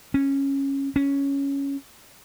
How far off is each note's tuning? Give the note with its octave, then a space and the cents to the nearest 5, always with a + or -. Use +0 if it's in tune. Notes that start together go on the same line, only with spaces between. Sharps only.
C#4 -10
C#4 +5